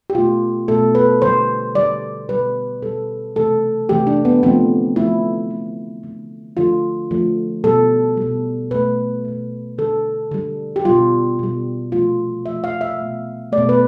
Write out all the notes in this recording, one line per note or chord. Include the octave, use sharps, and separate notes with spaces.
G4
B2 A3 F4
B2 A3 A4
B4
D3 G3 C5
D3 G3 D5
B2 G3 B4
B2 G3 A4
C3 E3 A3 A4
C3 E3 A3 G4
D4
B3
D3 F3 A3 C4
D3 F3 A3 E4
D3 A3
D3 A3
D3 F3 A3 F4
D3 F3 A3
B2 G3 A4
B2 G3
B2 A3 B4
B2 A3
D3 G3 A4
D3 G3
G4
B2 G3 F4
B2 G3
C3 F3 A3 F4
C3 F3 A3 E5
F5
E5
B2 A3
A3 D5
B2
B4